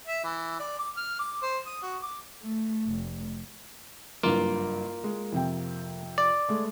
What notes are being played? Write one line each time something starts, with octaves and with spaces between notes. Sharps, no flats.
E5
E3
D5
D6
F6
D6
C5
D#6
F#4
D6
A3
F1
F#1 G2 A#3 F4
G#3
F2 C3 G5
D5
G#3 A3